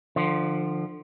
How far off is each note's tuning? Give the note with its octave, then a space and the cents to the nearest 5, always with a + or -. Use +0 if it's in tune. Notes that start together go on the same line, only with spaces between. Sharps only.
D3 +30 F3 +0